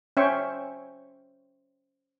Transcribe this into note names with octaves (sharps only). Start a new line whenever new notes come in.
C#4 C5 C#5 E5 G5 C#6